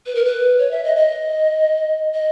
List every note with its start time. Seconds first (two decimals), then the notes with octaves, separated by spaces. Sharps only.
0.06 B4
0.15 A#4
0.25 B4
0.58 C#5
0.71 E5
0.84 D#5
0.96 D#5
2.14 D#5